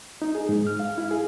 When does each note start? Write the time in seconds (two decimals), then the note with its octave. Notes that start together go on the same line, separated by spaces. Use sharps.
0.22 D#4
0.35 G#4
0.49 G#2
0.67 F6
0.80 F5
0.98 E4
1.11 G#4